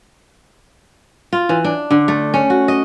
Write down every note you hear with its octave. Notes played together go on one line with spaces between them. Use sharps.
F4
E3
D4
D3
A3
C#4
F#4
D#5